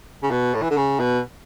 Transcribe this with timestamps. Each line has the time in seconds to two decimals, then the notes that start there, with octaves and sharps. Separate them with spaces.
0.23 C#3
0.31 B2
0.54 A2
0.62 E3
0.70 D3
0.77 C#3
0.99 B2